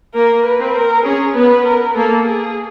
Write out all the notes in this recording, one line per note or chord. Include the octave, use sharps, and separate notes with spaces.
A#3 A#4
B4
C4
A#4
C#4 G#4
B3 B4
A#4
A#3 A4
G#4